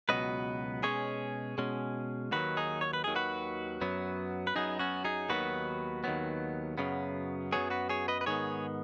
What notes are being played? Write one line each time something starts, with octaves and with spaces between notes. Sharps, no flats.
C#2 B2 F#3 B3 B4 D#5
B2 G#3 C#4 G#4 C#5
B2 G#3 C#4
D#2 D#3 F#3 F#4 B4
D#4 G#4
C#5
B4
D#2 D#3 F#3 G#4
F#4 B4
F#2 F#3 B3
B4
F#2 F#3 B3 D#4 G#4
C#4 F#4
D#4 G#4
D#2 D#3 F#3 B3 F#4 B4
D#2 D#3 F#3 B3
F#2 C#3 F#3 B3
F#2 C#3 F#3 B3 G#4 C#5
F#4 B4
G#4 C#5
B4 D#5
B4
G#2 D#3 B3 G#4 C#5